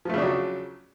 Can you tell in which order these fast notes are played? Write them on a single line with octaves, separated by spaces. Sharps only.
F3 A3 C#3 D4 F#3